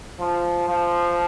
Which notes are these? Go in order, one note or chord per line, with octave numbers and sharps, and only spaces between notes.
F3
F3